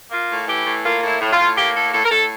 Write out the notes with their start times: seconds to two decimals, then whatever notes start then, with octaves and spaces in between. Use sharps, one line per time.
0.11 A#3 F4
0.30 A2
0.47 E3 G4
0.65 A2
0.84 A#3 F4
1.02 A2 E4
1.20 A2
1.32 F4
1.38 A2
1.56 A#3 G4
1.74 A2 A4
1.92 A2 A4
2.05 A#4
2.10 A2 A4